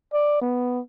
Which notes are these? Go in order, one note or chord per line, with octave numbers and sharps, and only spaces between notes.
D5
B3